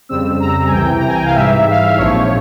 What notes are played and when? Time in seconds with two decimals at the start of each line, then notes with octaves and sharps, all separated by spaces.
0.09 F2 C#3 G3 C4 E6
0.40 A#5
0.67 G#5
0.72 C2 C3 E3 G5
0.98 A#5
1.08 G#5
1.17 G5
1.25 F5
1.35 G#2 E3 G3 E5
1.70 F5
1.84 E5
1.98 A#1 G#2 F3 C4 C#5